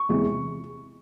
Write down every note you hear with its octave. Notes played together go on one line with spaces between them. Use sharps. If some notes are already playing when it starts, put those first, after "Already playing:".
Already playing: C#6
E2 C3 E3 G#3